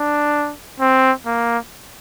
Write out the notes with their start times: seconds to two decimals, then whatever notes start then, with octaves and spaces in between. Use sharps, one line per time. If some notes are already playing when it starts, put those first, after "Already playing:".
Already playing: D4
0.80 C4
1.26 A#3